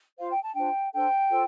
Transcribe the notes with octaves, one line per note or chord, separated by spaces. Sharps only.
F4 C5 F5
G5
A5
D4 F4 C5 G5
D4 A4 C5 G5
F4 A4 C5